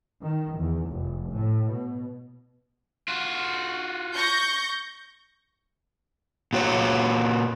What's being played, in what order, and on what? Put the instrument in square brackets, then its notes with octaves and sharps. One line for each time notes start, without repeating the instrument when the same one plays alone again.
[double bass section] D#3
E2
F1
A2
B2
[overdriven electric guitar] F4 F#4
[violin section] C#6 G6 A#6
[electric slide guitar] A#2 F#4 C#5